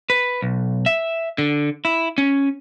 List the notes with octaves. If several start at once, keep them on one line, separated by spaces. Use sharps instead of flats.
B4
B1
E5
D3
E4
C#4